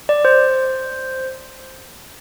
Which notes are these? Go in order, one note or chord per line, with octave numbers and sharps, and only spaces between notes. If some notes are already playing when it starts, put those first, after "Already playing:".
D5
C5